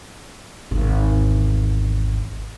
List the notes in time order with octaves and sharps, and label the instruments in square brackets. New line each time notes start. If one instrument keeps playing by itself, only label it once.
[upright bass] G#1 E2